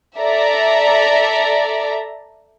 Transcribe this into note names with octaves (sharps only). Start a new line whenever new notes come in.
A4 D5 E5 A#5